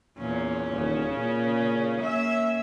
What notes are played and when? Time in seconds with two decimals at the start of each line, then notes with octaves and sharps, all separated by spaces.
0.18 E2 A#2 C#4
0.73 D#1 C#3
1.16 A#2
2.01 A#3 E5